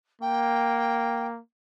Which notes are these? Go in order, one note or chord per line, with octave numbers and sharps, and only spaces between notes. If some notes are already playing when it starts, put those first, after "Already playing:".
A#3 G5